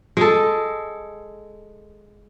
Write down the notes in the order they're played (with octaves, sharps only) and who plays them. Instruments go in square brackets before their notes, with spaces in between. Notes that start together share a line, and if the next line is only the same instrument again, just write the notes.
[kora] G#3 A4